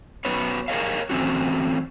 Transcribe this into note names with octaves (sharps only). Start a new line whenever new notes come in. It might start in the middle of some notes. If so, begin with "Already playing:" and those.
B3 C#4 F#4 B4 C#5
G#4 A#4 B4 C#5 D#5 F5
E3 A3 C4 C#4 F#4